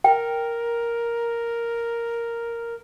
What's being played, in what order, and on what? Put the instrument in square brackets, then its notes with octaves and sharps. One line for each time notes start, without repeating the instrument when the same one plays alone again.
[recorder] A#4 [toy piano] G5